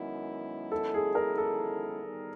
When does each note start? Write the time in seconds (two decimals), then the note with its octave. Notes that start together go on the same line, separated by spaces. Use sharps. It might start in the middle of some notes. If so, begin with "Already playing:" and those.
Already playing: F#2 D#3 G#3 B3 E4
0.72 A4
0.94 G#4
1.15 A#4
1.38 A4
2.02 D#3 G3 B3 D#4 G#4